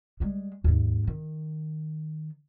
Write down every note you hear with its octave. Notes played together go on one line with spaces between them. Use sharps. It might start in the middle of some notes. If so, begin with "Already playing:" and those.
G3 G#3
D#2 G#2
D#3